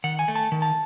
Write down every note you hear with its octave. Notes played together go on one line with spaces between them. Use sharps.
D#3 F#5
G#5
A3
A5
D#3
A5